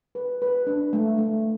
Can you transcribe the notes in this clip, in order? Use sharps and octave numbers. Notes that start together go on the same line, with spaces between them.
B4
B4
D4
A3
A3